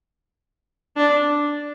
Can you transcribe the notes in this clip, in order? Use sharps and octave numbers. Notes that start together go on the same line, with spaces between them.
D4